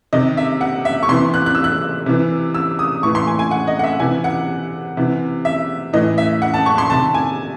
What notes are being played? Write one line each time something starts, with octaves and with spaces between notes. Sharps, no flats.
C3 D#3 D#5
E5
F#5
E5
C#6
C3 E3 C6
F#6
F#6
E6
F#6
C3 E3
E6
D#6
A2 E3 C#6
C6
G#5
G#5
F#5
D#5
F#5
E5
C3 E3 G#5
F#5
C3 E3
E5
A2 E3 D#5
E5
F#5
A5
C#6
C6
C3 D#3 A5
G#5